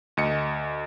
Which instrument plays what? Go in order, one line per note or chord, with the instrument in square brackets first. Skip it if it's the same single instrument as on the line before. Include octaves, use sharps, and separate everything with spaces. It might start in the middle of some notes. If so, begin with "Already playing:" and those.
[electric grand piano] D2 D#5 C#7